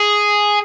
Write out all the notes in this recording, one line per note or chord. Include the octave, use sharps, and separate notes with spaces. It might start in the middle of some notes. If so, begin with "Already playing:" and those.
Already playing: G#4